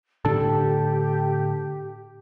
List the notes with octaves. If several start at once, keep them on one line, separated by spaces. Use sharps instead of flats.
A2 D3 D4 G4 A4 A5